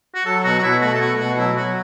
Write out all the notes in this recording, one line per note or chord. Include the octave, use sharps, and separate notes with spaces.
F#4
F#3 A4
B2 F#4
F#4
B2 E4
A3 F#4
A4
B2 F#4
B2 F#4
F#3 E4
F#3 F#4